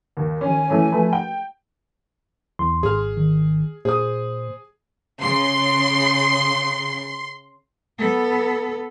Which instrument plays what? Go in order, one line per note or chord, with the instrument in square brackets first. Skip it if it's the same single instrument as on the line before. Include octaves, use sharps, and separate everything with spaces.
[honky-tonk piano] D#2
[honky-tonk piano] D#3 C#4 [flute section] G#5
[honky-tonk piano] E3 A3 C#4
F3 A3 B4
G5
[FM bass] E2 [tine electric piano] C6
[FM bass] G#1 [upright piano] G#4 F6
[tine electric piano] D#3
[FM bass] A#2 [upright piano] G#4 D#6 [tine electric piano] C5
[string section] C#3 [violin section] C6
[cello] B3 A4